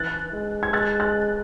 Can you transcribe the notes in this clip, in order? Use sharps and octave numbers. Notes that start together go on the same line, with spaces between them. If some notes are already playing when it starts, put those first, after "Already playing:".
Already playing: E3 F#6 A6
G#3
G#6
G#3 F#6 A6
F#6 A6